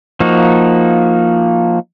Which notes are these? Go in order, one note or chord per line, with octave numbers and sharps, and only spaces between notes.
F3 A#3 D#4 F#4